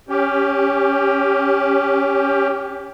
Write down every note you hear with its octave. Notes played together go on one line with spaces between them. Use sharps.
C#4 G4